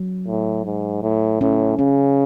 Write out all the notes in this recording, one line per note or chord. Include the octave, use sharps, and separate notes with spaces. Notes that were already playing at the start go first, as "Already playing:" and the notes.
Already playing: F#3
A2
G#2
A2
A2 C#4
C#3 C#4